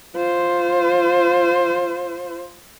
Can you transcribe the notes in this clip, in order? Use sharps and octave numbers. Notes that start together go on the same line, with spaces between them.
F4 C5